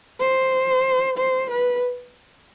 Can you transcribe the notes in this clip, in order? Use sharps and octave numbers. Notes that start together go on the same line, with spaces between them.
C5
C5
B4